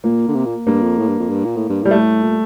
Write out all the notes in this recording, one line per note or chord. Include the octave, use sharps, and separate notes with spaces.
A#2 A#3
D3
C3
A#2
G2 A#3
F2
A2
G2
F2
G2
A#2
A2
G2
A2 G3
A3
A#2